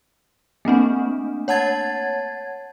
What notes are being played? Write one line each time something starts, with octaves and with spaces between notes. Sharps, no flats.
A3 A#3 C4 D4
C#5 F#5 A5 G#6 A6